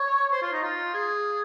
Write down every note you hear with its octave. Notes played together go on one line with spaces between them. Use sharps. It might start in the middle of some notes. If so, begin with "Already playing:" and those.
Already playing: C#5
C5
F4
D#4
F4
G#4